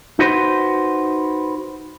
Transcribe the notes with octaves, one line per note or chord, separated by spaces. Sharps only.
D#4 F#4 B4 C5